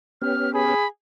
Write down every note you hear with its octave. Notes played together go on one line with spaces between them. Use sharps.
B3 C#4 G4 F6
G#4 B5